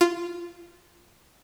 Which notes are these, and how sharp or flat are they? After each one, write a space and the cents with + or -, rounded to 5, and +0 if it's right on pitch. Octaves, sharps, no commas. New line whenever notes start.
F4 -10